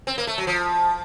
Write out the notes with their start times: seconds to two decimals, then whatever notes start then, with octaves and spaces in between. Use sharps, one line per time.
0.07 C4
0.18 A#3
0.27 A3
0.38 F#3
0.47 F3